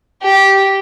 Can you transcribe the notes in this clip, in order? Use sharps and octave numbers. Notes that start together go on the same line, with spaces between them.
G4